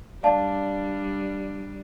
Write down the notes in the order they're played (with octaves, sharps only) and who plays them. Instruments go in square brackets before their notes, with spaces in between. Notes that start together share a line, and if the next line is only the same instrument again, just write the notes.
[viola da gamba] G3 D4 [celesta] D5 F5 A5